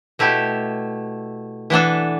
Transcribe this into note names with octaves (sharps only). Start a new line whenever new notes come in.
B2 A3 E4 G4
E3 B3 D4 A4